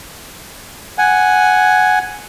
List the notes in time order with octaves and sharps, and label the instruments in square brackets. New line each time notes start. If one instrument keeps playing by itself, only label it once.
[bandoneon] F#5 G#5